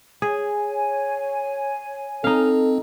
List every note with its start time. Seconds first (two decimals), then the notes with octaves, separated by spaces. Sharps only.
0.22 G#4 C#5 G#5
2.24 C4 D#4 A4 F5